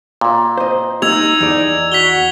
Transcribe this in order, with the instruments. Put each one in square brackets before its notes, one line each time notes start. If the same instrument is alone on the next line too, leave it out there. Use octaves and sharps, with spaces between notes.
[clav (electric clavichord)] A#2
[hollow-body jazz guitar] C5 D#5
[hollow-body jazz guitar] A#3 G4 [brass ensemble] D#4 [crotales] E6 G#6 F7
[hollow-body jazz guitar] E2 D5
[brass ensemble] F#4 [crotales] B6 F7 G7